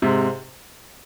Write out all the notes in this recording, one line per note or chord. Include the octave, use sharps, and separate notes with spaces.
G#2 C3